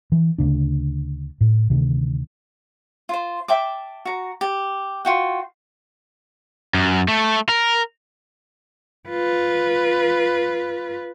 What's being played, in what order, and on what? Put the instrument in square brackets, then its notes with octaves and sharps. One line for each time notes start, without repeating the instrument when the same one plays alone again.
[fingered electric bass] E3
D2 C#3 D4
A2
D2 C3 D#3
[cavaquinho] F4 C5
E5 G5 A5 D6
F#4 A#5
G4
F4 F#4 G5
[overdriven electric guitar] F#2
A3
A#4
[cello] F4 B4